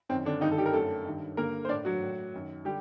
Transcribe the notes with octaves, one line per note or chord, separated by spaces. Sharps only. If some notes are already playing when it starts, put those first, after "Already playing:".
F#2 D#3 C4
D3 D4
G2 D3 D#3 D#4
A4
G3 G4
A#4
F#2 D3 A3 A4
G2 D#3
G2 D3 A#3 A#4
C5
A2 D4 D5
F#3 F#4
A2
F#2 D#3
D3 G3 G4